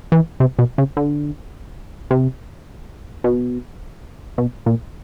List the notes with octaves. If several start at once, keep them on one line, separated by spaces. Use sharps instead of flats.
E3
C3
B2
C#3
D3
C3
B2
B2
A#2